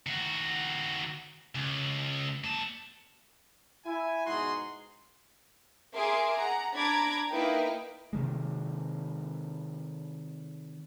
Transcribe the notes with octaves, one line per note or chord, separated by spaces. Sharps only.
D#3 F#4
C#2
A#3 A5
E4 G#5
G#2 B2 D#4 F#4 G#4 C6
G#4 A#4 E5 C6 D6
F#5 A#5
D4 A#5 B5 D6 G#6
A#3 D#4 E4 A#4 B4 G5
C3 D#3 G#3